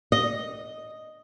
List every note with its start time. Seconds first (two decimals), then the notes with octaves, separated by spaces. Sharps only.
0.12 D#5